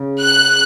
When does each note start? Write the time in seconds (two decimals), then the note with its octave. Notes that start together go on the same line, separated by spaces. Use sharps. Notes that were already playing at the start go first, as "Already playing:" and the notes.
Already playing: C#3
0.22 F#6